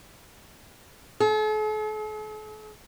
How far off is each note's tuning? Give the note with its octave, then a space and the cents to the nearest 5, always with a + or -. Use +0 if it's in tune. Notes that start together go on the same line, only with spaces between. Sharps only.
A4 -45